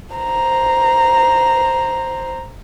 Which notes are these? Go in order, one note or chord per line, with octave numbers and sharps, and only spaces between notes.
C5 A#5